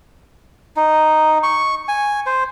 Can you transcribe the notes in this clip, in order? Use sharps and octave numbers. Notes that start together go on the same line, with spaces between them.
D#4
C#6
G#5
C5